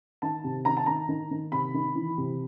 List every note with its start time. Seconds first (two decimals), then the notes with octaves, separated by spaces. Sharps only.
0.22 D#3 A5
0.44 C3
0.65 D#3 A#5
0.77 A5
0.86 D#3 A#5
1.09 D#3
1.31 D#3
1.52 C3 B5
1.74 D#3
1.95 E3
2.17 C3